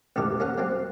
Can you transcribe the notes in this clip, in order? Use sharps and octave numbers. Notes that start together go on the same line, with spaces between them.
A1 E2 G#2 E3 G4 A#4
A#3 C#4 A#4 F#5
F#3 A#3 C4